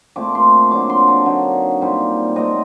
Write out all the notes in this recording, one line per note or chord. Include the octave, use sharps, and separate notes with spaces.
A#2 A3 C4 D6
C6
D3 F#3 A#3 D6
C6
A5
D3 F#3 A#3 D#4
A#2 G3 C4 D#4
C3 F#3 A3 C4 D#5